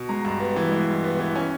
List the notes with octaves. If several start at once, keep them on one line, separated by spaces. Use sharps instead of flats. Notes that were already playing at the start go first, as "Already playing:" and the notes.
Already playing: B2
G#3 A#5
G2
B3
E3
G#3
G2
B3
E3
C#4 G#5